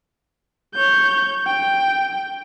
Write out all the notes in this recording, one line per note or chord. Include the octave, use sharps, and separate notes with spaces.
C#5 G6
G5